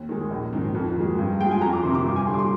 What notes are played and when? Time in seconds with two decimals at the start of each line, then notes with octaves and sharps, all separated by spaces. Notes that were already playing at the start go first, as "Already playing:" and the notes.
Already playing: D#2
0.09 D#3 G#3
0.31 A#1
0.53 G#2 D#3
0.75 F2
0.96 D#3 G#3
1.18 G2
1.40 F3 G#3 G5
1.51 G#5
1.61 F2 A#5
1.73 D6
1.83 C3 D#3 C6
1.94 D6
2.05 G2
2.16 G#5
2.27 D3 C6
2.32 G3 D6
2.38 C6